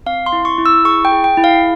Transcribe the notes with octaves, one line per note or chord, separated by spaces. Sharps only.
C4 F5
C6
E4
C#6
E4
E6
G#4 C#6
G5
G#4
G5
E4
F5